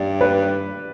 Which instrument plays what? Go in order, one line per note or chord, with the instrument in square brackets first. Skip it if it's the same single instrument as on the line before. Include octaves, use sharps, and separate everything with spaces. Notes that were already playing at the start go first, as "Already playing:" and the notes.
Already playing: [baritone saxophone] G2 [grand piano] D5
[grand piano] B4